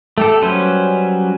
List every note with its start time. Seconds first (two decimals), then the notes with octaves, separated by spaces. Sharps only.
0.18 A3 G4 A4
0.42 F#3 G3 C#4 B4 C5